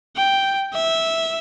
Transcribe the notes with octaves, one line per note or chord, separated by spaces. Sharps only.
G5
E5